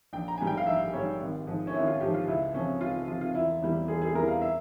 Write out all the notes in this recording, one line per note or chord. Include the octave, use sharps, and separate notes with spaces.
A#1 G5
A#5
G#2 G3 G#5
G5
F5
A#1 E5
G#2 G3 C#5
G#1
G#2 F3
C#4
G#1 E4
F4
G#2 F3 G4
F4
C#2 E4
C3 F3 C#4
C#2 F4
C3 F3 F4
F4
E1 E4
E2 E3 G3
E1 G#4
G#4
E2 E3 G3 A#4
F5
E5